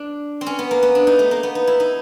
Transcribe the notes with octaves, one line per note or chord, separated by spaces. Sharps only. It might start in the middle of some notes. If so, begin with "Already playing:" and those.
Already playing: D4
C4
C#4
B3
A#3
B3
D4
D#4
A3
A#3
B3
D#4
E4
D#4